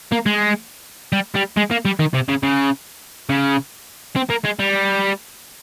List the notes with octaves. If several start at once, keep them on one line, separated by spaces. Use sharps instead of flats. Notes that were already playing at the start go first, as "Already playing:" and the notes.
A#3
G#3
G3
G3
G#3
A#3
G3
D#3
C3
C#3
C#3
C#3
C4
A#3
G#3
G3